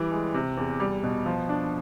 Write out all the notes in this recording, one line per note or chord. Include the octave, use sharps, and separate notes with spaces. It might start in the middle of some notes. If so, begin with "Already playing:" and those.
Already playing: E3 G3
G#3
C3
E2
G3
B2
F3
D4